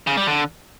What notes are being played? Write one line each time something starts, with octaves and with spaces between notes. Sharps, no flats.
C#3
G3
D3